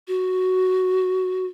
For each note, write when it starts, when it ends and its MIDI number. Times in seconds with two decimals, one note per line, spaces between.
0.08 1.46 66